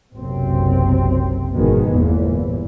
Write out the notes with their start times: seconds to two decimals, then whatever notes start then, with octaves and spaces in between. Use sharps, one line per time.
0.16 F#1 B1 F#2 C3 C4
1.53 G#1 B2 D#3 F3 G#3 B3
1.91 G1 E2 A#2 E3